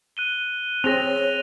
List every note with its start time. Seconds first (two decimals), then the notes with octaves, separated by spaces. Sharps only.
0.17 F#6 D#7 G7
0.84 C4 G#4 C#5 A#6 D#7 F7